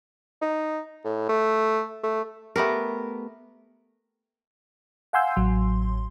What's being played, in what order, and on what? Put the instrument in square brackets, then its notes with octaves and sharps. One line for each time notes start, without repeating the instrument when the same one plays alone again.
[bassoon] D#4
A2
A3
A3
[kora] A3 B3 G4 A#4
[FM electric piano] F5 F#5 G#5 C6 E6 G6
A1 F#3 C6